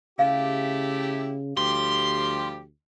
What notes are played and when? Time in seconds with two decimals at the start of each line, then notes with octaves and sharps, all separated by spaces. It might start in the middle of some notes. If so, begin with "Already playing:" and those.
0.19 C#3 A3 E4 G4 F5
1.57 D2 F3 G3 G4 C6